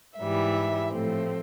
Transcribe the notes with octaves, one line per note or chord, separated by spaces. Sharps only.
G#2 E3 G3 E5
A2 F3 A3 C4